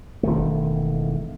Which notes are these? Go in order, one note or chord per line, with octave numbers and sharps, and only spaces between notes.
E1 D#3 A3